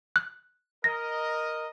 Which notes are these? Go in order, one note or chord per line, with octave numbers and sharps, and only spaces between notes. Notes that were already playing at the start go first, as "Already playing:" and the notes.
F#6
A#4 D#5 A#6